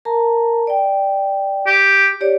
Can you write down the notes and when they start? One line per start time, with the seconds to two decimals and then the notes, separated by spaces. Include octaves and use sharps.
0.05 A#4 A5 A#5
0.67 D5 G5
1.67 G4
2.21 G4 C#5 D5